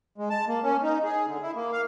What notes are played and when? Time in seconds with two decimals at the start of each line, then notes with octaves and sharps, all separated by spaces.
0.18 G#3
0.30 A5
0.48 A#3
0.64 C#4
0.83 D#4
1.04 G#4
1.27 D3
1.42 E4
1.55 A#3
1.72 F5